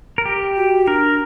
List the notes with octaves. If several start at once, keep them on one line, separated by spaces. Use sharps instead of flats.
A#4
G4
F#4
D4 A#4